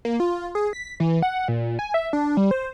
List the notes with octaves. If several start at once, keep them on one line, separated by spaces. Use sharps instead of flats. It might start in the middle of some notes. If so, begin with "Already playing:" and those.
A#3
F4
G#4
B6
E3
F#5
A#2
G#5
E5
D4
G3
C5